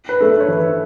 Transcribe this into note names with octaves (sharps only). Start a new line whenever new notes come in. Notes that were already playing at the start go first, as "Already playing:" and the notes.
B4
A3 D4 A4
C#5
E3 B4